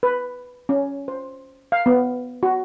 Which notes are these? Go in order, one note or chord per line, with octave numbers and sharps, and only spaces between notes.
B4
C#4
C5
F5
B3
F#4